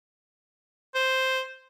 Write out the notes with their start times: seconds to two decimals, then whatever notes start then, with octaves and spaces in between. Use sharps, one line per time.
0.95 C5